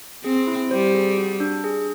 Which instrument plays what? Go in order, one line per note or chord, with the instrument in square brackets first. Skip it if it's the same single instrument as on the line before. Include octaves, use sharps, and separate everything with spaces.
[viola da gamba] C4 [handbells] G#4
[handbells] E4
[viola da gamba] G3 [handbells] C5
[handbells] G#4
F#4
D4
G#4